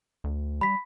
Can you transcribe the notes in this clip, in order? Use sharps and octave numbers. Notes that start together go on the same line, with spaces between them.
D2
G3 B5 B6